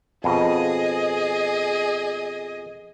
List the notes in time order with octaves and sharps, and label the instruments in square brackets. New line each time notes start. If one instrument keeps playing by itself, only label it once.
[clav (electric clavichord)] F2 B2 [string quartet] G#4 D#5